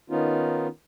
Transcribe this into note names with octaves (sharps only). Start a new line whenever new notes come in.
D#3 B3 C#4 D#4 F4